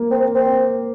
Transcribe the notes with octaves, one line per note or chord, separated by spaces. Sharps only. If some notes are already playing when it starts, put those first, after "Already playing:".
Already playing: A#3
C4
C4